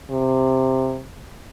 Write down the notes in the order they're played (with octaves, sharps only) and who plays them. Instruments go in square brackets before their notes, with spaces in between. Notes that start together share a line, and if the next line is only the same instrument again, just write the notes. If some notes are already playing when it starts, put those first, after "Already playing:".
[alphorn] C3